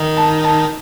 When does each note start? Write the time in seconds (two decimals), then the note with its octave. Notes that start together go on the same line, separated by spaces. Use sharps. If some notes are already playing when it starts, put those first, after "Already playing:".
Already playing: D#3 D#4
0.17 A5
0.44 A5